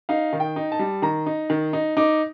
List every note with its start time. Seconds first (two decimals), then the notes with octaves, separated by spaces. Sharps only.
0.09 D#4 F5
0.33 D#3
0.40 G5
0.56 D#4
0.72 A5
0.79 G3
1.02 D#3 A#5
1.26 D#4
1.50 D#3
1.73 D#4
1.97 D#4 D6